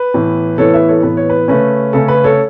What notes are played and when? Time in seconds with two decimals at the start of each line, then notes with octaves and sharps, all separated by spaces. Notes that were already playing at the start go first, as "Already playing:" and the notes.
Already playing: B4
0.14 A2 E3 B3
0.58 A2 E3 B3 A4 C#5
0.74 B4 E5
0.88 A4 C#5
1.03 A2 E3 B3 B4
1.17 C#5
1.30 B4
1.48 C#3 A3 C#4 B4
1.93 C#3 A3 C#4 A4
2.08 B4
2.24 A4 C#5